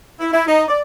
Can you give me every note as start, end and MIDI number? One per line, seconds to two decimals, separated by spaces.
0.20 0.32 64
0.32 0.45 64
0.47 0.63 63
0.68 0.80 74